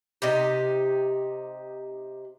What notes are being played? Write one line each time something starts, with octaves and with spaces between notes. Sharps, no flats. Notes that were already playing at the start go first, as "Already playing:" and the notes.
C3 D#4 G4